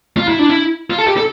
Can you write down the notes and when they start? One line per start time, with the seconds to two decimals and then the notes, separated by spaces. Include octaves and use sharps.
0.17 F4
0.28 E4
0.39 D4
0.49 E4
0.90 F4
0.98 A4
1.07 G4
1.17 A4